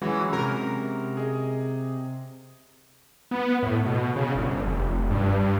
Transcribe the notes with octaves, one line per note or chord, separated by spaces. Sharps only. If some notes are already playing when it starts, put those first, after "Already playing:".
E3 F#3 G#3 C#4 F#4
C3 A#4
G#4 D#5
B3
A2
B2
C#3
G1
F1
G2
G2